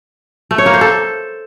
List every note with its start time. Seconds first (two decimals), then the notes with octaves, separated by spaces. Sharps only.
0.51 A3
0.58 C#5
0.66 A#3
0.74 C5
0.81 A4